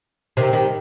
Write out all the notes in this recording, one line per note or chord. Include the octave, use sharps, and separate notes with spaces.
C3 D#3
D#3 G3